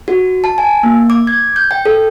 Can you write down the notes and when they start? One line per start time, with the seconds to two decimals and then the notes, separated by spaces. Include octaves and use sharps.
0.08 F#4
0.44 A5
0.58 G#5
0.83 A#3
1.10 D6
1.27 G#6
1.56 G6
1.71 G5
1.85 A4